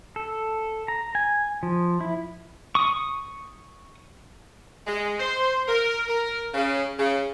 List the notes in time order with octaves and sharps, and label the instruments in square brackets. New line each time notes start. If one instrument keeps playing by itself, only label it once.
[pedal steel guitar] A4
A#5
G#5
F3
E4
C#6 D#6
[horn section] G#3
C5
A#4
A#4
C#3
C#3